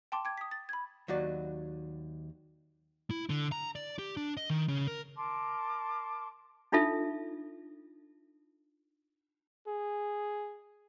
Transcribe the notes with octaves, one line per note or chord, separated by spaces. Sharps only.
G5 A5 C6 D6
G5 D6 G#6
D#6 B6
A6
B5 G#6
D#2 F#3 F#4 D5
E4
D3
A#5
D5
G4
D4
D#5
D#3
C#3
A#4
A#4 A5 C6 D6
D4 D#4 F4 A4 E5
G#4